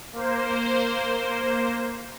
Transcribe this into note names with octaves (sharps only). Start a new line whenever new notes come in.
A#3 C5